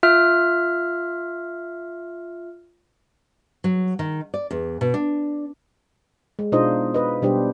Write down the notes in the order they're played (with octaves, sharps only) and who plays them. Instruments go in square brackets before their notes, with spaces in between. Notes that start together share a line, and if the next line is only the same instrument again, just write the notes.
[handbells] F4 E5 F6
[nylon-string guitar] F#3
D#3
D5
E2
B2
D4
[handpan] G#3
B2 D4 D#4 F4 C5 D#5
B4 D#5
B2 G3 D4 G4 C5